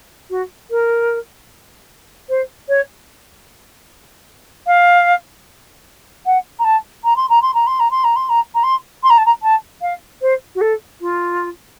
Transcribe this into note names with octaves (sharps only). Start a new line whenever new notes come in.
F#4
A#4
C5
C#5
F5
F#5
A#5
A5
A#5
C6
A#5
C6
A#5
C6
A#5
C6
A#5
C6
A#5
A#5
C6
C6
A#5
A5
A#5
A5
F5
C5
F#4
A4
F4